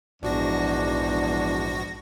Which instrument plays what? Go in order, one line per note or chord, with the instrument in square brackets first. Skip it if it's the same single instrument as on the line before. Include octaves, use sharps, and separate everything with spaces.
[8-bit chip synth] A#1 F#4 A#6 [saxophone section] E2 G#2 D4